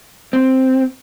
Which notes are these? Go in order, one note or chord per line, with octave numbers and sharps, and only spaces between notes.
C4